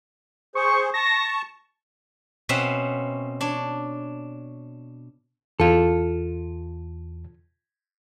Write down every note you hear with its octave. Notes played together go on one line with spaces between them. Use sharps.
G#4 C5 C#6
A5 C#6 A#6
B2 C4 C#4 B4 E5 F#5
D4 C#5
E2 F4 A4